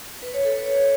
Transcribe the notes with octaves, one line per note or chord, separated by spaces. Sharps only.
B4
C#5
A4
B4
C#5